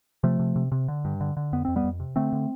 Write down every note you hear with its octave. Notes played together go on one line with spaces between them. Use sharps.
C3 F3 A3
C3
C3
C3
D3
G2
D3
D3
F2 B3
F2 C4
G3 B3
F2
C3
D3 A3 C4
D3